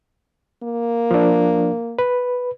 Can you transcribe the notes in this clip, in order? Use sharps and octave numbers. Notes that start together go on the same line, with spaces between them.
A#3
F3 D4
B4